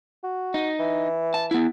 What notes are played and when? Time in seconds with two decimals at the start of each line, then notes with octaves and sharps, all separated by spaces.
0.24 F#4
0.54 D#4
0.79 E3
1.34 A5
1.51 B3 E4